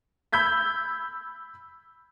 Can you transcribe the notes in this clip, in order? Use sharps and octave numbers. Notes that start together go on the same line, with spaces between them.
B5 E6 G6 G#6 B6